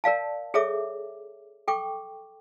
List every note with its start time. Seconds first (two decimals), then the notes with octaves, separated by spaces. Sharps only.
0.04 A#4 D5 F5 A5
0.54 G#4 A4 C#5 E5 D6
1.68 A4 G5 C#6 D6